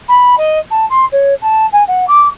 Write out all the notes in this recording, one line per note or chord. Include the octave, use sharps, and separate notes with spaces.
B5
D#5
A5
C6
C#5
A5
G#5
F#5
D6